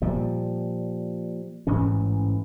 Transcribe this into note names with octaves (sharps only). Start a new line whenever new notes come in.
A#2 F3 G3
A1 G#2 E3 C#4